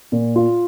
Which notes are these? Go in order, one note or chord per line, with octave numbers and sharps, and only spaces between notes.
A#2
F4